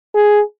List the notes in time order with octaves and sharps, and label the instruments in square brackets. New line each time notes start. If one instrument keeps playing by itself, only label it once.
[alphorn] G#4